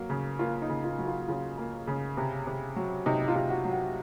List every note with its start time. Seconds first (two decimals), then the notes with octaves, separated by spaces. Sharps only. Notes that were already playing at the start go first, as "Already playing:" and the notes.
Already playing: F#3 A#3
0.10 C#3
0.39 A#3 F4
0.62 D#4
0.69 C#3
0.84 F4
0.99 F#3
1.06 F4
1.28 C#3 F4
1.58 A#3
1.87 C#3
2.17 C3
2.47 C3
2.76 F#3
3.06 C3 D#4
3.28 F4
3.35 C3
3.50 F#4
3.65 F#3
3.73 F#4